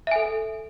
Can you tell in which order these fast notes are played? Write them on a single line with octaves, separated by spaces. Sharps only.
E5 G#5 A4